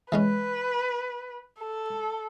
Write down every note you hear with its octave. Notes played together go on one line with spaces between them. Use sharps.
E3 G#3 C#4 B4
A4